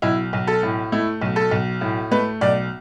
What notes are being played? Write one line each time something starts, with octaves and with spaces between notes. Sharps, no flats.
B1 E4
B1
A4
A2
A3 E4
B1
A4
B1
A2
A3 B4
B1 D5